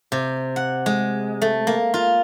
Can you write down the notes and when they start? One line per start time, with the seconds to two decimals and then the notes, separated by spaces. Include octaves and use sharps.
0.12 C3
0.56 F#5
0.86 G#3
1.42 A3
1.67 A#3
1.94 F4